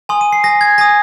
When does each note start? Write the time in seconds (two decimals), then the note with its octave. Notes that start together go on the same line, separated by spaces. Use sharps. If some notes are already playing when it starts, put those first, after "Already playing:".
0.09 G#5 C6 D#6
0.21 D#7
0.33 C7
0.43 G#5 D#6 A#6
0.61 G#6
0.78 G#5 D#6 A#6